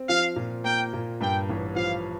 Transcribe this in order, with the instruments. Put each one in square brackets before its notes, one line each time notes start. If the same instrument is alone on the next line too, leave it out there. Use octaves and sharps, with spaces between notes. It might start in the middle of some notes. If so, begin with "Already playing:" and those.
Already playing: [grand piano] C4
[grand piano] F3 [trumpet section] F5
[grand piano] A#2
[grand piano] A#3 [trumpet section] G5
[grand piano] A#2
[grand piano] G2 [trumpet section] G5
[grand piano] A1
[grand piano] F3 [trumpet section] F5